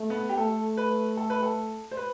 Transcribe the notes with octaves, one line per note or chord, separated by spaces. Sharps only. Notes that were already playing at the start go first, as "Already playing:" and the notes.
Already playing: A3
B3
G4
A3 A4
B4
A4
B4
A4
C5
B4